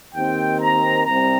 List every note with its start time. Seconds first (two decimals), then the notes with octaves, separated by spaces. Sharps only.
0.15 D#2 D#3 C4 G5
0.60 A#5
1.05 C2 C3 G3 C4 A#5